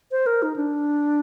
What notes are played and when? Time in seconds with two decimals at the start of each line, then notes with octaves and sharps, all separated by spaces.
0.11 C5
0.26 A#4
0.42 D#4
0.56 D4